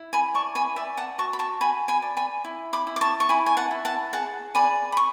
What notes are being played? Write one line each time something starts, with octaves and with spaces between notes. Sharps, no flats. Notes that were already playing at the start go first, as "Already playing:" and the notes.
Already playing: E4
G#5 B5
D5 A5 C#6
G#5 B5
D5 E5 G#5
F#5 A5
F#4 A5 C#6
B5
A5 C#6
F#4 G#5 B5
G#5 B5
D5
G#5 B5
E4
B5 D6
E4
D6
A5 C#6
C#6
E4 G#5 B5
G#5
F#5 A5
E4
F#5 A5
G#4 F#5 A5
D5 G#5 B5
B5
C#6